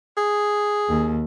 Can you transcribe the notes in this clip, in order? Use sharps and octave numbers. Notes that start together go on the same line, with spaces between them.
G#4
D#2